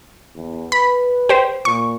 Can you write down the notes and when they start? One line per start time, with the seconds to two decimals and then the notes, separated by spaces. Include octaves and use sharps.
0.36 E2
0.72 B4 B5
1.29 G4 C5
1.65 A#2 C#6